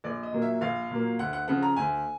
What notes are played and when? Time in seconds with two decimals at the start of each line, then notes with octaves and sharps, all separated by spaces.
0.04 A#1 D5
0.23 D#5
0.33 A#2 F#3 A#3
0.42 E5
0.61 A#1 F5
0.90 A#2 F#3 A#3
1.19 D2 F#5
1.33 F#5
1.48 C#3 F3 F#5
1.62 A#5
1.76 D2 G#5